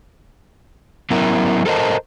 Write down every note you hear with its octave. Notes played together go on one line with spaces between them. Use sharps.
F#3 B3 C#4 E4 A#4
A4 A#4 C5 D#5 A5